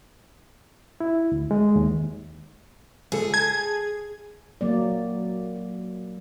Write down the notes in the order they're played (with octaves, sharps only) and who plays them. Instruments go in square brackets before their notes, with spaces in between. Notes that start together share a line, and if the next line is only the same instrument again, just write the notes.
[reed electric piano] E4
D2
G#3
D#2
[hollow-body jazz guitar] C#2 A4 [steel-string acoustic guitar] G#4
[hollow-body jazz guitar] A5 [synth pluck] G#6
[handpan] F#3 A#3 D5